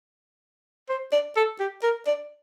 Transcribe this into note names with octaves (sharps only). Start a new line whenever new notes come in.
C5
D5
A4
G4
A#4
D5